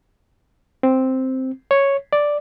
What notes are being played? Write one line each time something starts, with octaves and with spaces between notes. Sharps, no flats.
C4
C#5
D5